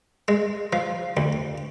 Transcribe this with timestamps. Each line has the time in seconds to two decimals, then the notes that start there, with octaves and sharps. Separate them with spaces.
0.28 G#3
0.73 F3
1.17 D2